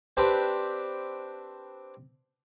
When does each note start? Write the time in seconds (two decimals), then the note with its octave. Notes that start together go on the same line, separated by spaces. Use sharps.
0.17 C4 D4 G4 B4